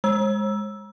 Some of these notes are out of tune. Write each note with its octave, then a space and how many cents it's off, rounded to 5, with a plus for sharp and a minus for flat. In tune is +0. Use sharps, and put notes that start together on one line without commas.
G#3 -10 E6 +0